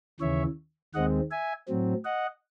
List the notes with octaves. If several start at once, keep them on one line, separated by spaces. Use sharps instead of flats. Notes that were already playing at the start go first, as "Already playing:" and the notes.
D#2 C#3 E3 C#5 E5
D#2 D#3 G#3 C4 D#5 F#5
E5 G#5
A2 F#3 C4
D#5 F#5